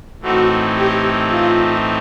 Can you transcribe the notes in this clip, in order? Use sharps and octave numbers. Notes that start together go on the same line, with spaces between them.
A2 E3 A3 C4 D#4 F#4
G4
F4